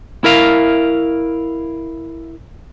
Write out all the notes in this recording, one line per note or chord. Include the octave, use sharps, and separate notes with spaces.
E4 A#4 E5 F5